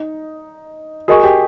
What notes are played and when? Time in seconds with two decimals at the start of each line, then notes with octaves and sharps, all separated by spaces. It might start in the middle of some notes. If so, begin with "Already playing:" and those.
Already playing: D#4
1.08 F#4 G#4 A#4 D#5 G#5 C#6
1.23 G4